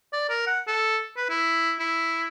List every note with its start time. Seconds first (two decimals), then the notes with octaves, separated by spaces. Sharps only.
0.13 D5
0.29 A#4
0.47 F#5
0.67 A4
1.17 B4
1.30 E4
1.80 E4